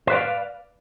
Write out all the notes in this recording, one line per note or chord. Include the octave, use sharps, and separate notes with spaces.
B4 C5 D5 F5